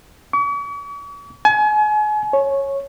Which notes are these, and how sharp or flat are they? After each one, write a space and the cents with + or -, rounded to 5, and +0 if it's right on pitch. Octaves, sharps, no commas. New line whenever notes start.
C#6 +45
G#5 +35
C#5 -10